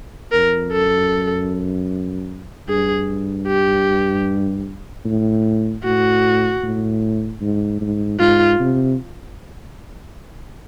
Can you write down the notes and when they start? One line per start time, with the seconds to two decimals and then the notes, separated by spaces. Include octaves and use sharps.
0.32 F2 A#4
0.71 F#2 A4
2.69 G2 G#4
3.48 G4
5.05 A2
5.84 A2 F#4
6.63 A2
7.41 G#2
7.81 G#2
8.20 G#2 F4
8.59 C3